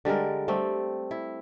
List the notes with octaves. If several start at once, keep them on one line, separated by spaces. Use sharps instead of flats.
D3 G3 G#3 A#4
G3 A3 C4
E4